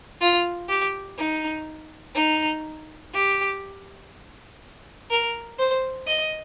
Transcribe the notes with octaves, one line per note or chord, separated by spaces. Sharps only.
F4
G4
D#4
D#4
G4
A#4
C5
D#5